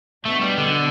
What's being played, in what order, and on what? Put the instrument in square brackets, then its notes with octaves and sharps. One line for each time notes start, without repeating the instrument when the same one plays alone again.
[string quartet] B2 B3 D4 [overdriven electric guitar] A3
[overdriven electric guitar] G3
D3